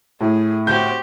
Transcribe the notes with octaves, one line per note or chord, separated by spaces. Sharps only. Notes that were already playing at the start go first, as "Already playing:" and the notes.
A2 G#4
C4 F#4 G4 G6